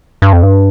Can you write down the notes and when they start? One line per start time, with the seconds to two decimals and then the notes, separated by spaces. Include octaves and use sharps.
0.22 G2
0.33 F2
0.43 G2